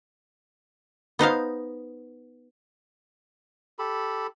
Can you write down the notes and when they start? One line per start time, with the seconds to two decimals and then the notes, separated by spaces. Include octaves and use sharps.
1.19 B3 D#4 C5 F5
3.79 G4 A4 B5